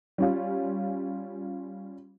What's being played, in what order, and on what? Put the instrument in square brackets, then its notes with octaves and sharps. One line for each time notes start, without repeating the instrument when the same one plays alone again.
[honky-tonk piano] G3 C#4 F4